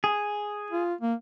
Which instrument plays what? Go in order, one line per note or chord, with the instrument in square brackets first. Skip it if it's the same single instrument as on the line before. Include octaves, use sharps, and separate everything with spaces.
[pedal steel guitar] G#4
[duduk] F4
A#3